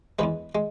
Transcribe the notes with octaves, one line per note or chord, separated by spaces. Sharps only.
E2 E3 G#3 B4
G#3